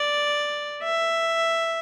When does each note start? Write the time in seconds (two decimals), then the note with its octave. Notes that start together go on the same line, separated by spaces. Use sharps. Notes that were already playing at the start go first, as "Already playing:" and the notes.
Already playing: D5
0.83 E5